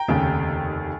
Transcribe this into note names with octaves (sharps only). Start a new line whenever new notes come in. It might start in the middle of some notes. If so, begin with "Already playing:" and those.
Already playing: G5 A#5
F1 D#2 C#3